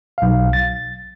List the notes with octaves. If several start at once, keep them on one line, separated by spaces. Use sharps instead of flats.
B1 F5
A6